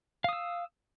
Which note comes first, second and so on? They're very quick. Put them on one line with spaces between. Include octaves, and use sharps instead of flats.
F5 D#6 E6